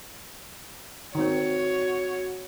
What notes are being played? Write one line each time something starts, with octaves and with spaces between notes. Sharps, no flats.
D#3 C4 F#4 C#5